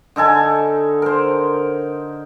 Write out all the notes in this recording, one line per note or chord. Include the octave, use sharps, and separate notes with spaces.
D3 D#4 A4 G#5
A#4 C5